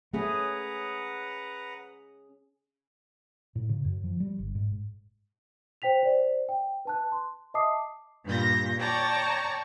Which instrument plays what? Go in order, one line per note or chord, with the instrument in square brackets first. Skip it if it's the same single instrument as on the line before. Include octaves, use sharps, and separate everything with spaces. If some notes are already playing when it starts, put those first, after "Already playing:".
[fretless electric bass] A3 [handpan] C#4 G#4 [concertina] B4 F#5 A#5
[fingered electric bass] A2
C#3
F#2
F3
G3
G1
G#2
[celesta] C5 G5 B6 F7
C5 D5
G5
B4 A5 F#6
C6
D#5 E5 A5 D6 D#6 C7
[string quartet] G2 A#2 G3 G6 A#6
C#5 D5 G5 A5 A#5 C#6